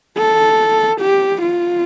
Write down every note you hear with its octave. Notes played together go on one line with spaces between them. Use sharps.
A4
G4
F4